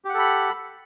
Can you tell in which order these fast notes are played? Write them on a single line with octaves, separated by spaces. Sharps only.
G4 F#5 A4 B5